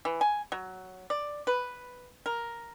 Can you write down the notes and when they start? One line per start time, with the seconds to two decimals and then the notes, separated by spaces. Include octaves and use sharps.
0.05 E3
0.21 G#5
0.52 F#3
1.10 D5
1.47 B4
2.26 A#4